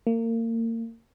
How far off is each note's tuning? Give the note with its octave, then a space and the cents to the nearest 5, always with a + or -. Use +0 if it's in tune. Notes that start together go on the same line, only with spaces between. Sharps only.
A#3 -35